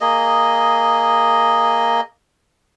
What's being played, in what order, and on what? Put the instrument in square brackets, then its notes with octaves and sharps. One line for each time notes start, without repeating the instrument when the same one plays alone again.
[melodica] A#3 G#4 D#5